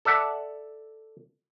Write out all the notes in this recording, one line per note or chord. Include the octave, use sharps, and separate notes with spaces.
A4 D5 E5 F#5